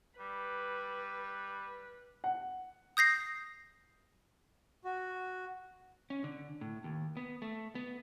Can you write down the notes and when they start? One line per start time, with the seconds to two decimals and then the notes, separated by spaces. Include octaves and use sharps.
0.20 G3 B4
2.24 F#5
2.97 D#6 G6 A#6 C7
4.84 F#4
6.10 C#4
6.24 D3
6.61 A2
6.84 D#2
7.17 B3
7.42 A3
7.75 B3